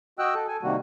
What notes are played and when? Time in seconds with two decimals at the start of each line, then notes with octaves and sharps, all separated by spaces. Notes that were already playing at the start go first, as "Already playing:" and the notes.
0.19 F#4 D#5 G5 E6 F#6
0.35 A4
0.48 A4 G#5
0.63 C3 D#3 G3 A#3 F#4